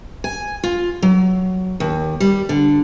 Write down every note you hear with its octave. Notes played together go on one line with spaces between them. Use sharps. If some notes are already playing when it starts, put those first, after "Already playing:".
G#5
F4
F#3
D#2
G3
D3